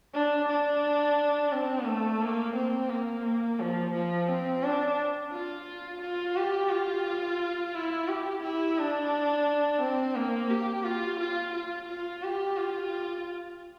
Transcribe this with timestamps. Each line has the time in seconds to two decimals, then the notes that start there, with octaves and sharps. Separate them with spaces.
0.14 D4
0.49 D4
1.52 C4
1.87 A3
2.22 A#3
2.56 C4
2.90 A#3
3.24 A#3
3.60 F3
3.93 F3
4.29 C4
4.63 D4
5.32 F4
6.01 F4
6.36 G4
6.70 F4
7.74 E4
8.08 G4
8.43 E4
8.78 D4
9.81 C4
10.16 A#3
10.50 G4
10.84 F4
11.19 F4
11.53 F4
11.88 F4
12.23 G4
12.57 F4